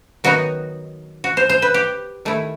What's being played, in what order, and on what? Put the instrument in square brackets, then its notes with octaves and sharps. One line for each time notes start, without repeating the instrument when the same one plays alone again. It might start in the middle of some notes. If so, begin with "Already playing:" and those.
[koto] D#3 F#3 B3 D#4 F#4
F#4
C5
C5
B4
G4
D#3 A3 E4